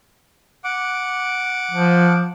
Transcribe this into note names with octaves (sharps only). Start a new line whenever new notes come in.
F#5 D6
F3